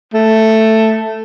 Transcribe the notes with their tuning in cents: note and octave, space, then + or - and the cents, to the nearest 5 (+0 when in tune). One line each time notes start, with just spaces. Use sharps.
A3 +5